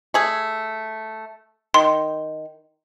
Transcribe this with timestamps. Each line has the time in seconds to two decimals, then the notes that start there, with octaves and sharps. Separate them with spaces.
0.14 A3 G#4
1.74 D#3 C6